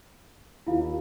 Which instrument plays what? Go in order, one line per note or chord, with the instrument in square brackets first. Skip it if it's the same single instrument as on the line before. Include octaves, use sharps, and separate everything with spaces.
[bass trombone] D#2 [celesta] E4 F4 F5